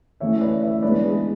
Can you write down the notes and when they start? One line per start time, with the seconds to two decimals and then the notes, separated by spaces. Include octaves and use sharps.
0.20 E3 A3 C#4 C#5 E5
0.41 B4 D5
0.62 C#5 E5
0.82 E3 G#3 B3 D4 B4 D5
1.03 G#4 B4